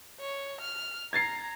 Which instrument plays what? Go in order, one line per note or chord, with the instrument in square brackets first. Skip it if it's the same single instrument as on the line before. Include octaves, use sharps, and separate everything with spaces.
[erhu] C#5
F6
[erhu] A#5 [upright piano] G#6 A6 C7